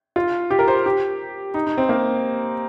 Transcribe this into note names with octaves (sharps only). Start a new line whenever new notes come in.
F4
G4
A#4
C5
G4
D#4
D#4
C4
A#3